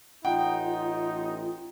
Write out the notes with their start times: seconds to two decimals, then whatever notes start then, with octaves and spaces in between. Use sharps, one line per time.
0.25 A1 D#4 F4 F#5 G5